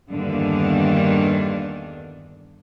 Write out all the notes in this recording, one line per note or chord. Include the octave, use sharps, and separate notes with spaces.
E2 G2 D3 D#3 A#3 D4